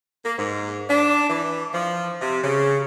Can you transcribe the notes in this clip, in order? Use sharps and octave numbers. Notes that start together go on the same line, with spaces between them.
A#3
G#2
D4
E3
F3
C3
C#3